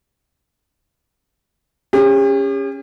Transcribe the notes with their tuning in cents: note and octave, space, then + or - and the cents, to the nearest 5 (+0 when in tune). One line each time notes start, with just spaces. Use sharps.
C#4 +0 G4 +45